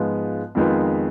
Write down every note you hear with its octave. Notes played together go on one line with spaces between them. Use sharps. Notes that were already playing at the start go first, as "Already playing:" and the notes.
Already playing: G#2 F3 G#3 B3 F4
F2 D#3 G#3 B3 F4